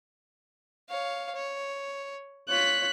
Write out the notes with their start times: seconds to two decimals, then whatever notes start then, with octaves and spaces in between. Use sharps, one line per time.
0.89 C#5 F5
1.35 C#5
2.49 F4 C#5 F#6 B6